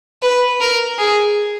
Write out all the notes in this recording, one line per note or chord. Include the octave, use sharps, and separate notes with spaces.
B4
A#4
G#4